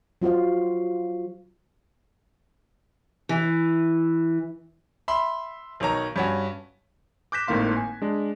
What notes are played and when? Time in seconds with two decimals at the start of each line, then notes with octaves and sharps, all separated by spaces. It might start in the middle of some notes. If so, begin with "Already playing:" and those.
0.22 F#3 F4 F#4 C5 F5
3.29 E3
5.08 E5 B5 C6
5.80 B1 D#3 C#5 A#5
6.16 G2 C#4 F#4
7.32 D6 F#6 G6 A#6 B6 E7
7.48 G#1 A2 D#3 A#3 F5 C6
7.77 G#5
8.02 G#3 D4